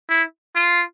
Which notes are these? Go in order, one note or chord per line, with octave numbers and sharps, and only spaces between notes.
E4
F4